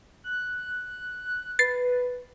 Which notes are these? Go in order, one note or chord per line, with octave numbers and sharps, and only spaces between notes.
F#6
B4 A6 C7